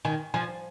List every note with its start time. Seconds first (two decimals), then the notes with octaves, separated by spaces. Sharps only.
0.05 D#3 G#5
0.34 F3 G#5